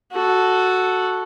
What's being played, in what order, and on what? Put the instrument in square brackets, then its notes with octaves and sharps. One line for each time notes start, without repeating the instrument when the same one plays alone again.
[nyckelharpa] F#4 A4